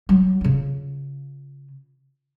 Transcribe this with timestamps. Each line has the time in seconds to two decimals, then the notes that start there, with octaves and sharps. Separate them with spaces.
0.09 F#3
0.41 C#3 F4